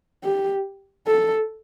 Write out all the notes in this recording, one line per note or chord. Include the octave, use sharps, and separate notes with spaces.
G4
A4